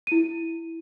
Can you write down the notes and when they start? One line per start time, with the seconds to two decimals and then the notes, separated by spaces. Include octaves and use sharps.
0.07 E4 D#7